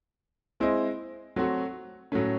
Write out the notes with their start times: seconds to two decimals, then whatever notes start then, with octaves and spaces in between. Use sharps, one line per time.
0.60 G#3 C4 E4 C5 D#5
1.36 F#3 A3 C4 F#4
2.12 A2 F#3 A3 C#4